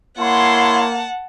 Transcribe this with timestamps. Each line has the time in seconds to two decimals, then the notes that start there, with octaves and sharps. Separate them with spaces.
0.18 A#3 E4 C#5 F#5 A5 C6